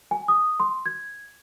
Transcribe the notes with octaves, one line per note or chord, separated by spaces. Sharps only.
G#5
D#6
C6
G#6